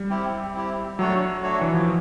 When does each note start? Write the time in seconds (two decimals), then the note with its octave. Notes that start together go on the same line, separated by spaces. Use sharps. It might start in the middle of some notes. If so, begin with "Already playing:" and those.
Already playing: G3
0.10 C4 E4 G4
0.54 C4 E4 G4
0.99 F#3 A3 D4 F#4 A4 C#5
1.43 A3 D4 F#4 A4 C#5
1.61 E3
1.74 F3